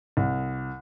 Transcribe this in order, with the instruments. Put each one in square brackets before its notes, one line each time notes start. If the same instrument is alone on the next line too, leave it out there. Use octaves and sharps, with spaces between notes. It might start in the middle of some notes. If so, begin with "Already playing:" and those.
[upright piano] C2